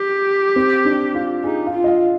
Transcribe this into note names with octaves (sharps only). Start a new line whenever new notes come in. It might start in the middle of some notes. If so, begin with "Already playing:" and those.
Already playing: G4
C4
D4
F4
D#4 G#4
F5
F4
D#5
F5